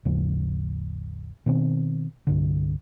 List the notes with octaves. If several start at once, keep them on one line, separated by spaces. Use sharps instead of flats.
G#1 D#2 C#3 F3
B2 D#3 C4
C2 G2 D3